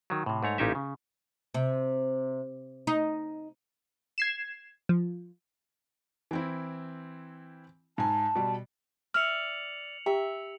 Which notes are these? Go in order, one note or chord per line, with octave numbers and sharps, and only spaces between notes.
D#3 F#3
A2 C3
G#2 A3 C#5 A#5
A1 A#2 C#4 D#4 G4 E5
C#3
C3
D#4
G#6 C7 E7
F3
E3 C4 E4
G#2 G#5 A5
B2 G3
D5 E5 F6 C#7 F7 F#7
G4 E5 G5 A#5